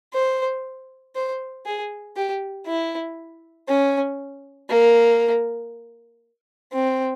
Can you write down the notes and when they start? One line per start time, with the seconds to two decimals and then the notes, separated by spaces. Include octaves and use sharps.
0.14 C5
1.16 C5
1.66 G#4
2.16 G4
2.67 E4
3.68 C#4
4.70 A#3
6.73 C4